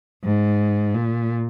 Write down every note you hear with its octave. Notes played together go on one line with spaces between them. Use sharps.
G#2
A#2